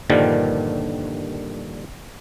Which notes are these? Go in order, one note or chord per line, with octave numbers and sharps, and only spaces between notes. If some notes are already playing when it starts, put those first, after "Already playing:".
G2 A#2 D3 D#3 F3 G3